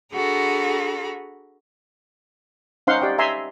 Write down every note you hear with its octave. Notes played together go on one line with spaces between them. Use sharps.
D4 F#4 G#4 A4 A#5 B5
C#4 D#4 C5 F5 F#5 C6
G4 D5 G5
E5 G#5 A#5 C6